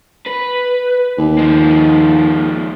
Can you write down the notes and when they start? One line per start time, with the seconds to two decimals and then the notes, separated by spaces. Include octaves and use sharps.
0.26 B4
1.18 D#2
1.39 F3 G#3